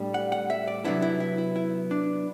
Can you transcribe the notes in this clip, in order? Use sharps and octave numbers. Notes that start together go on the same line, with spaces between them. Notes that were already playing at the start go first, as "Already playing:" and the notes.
Already playing: A2 G3 D4
F#5
F#5
E5
D5
C3 F#3 B3 D4 E4
E4
E4
E4
E4
D4